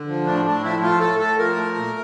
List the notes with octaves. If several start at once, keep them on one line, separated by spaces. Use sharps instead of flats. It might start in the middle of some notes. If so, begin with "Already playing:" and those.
Already playing: D3
F3
A2 D4
A2 D4
F3 E4
A3 F4
A2 A4
A2 A4
F3 A#4
A3
A#2